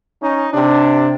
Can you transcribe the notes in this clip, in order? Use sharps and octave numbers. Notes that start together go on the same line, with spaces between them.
C#4 D#4
C3 D4